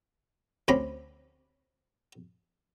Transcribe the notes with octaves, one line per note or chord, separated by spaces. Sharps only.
D2 C4 C#4 A#5 B5 D6